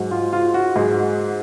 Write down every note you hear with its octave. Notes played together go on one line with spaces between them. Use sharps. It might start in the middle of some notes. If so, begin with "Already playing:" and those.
Already playing: G#2 F#3
F4
F4
F#4
G#2 F#3 G#4